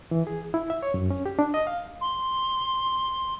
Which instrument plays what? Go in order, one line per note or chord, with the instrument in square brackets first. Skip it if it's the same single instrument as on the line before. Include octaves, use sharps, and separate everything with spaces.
[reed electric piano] E3
G#4
E4
E5
C#5
F#2
C#4
G4
D4
D#5
F5
[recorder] C6